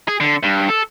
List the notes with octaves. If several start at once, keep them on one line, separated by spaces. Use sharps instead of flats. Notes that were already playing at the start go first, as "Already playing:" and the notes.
G#4
D3
G2
A4